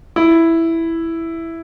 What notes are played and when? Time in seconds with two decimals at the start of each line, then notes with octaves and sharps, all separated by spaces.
0.16 E4